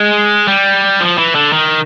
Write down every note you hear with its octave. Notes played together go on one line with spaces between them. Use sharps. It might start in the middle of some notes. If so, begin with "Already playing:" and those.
Already playing: G#3
G3
F3
E3
D3
D#3